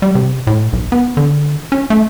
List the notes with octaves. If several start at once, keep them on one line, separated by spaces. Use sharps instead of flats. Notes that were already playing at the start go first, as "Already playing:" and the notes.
G3
C3
A2
B1
B3
D3
C#4
A3